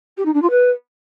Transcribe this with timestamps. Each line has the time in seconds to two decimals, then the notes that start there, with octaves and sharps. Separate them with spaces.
0.17 G4
0.25 D#4
0.34 D4
0.42 F4
0.50 B4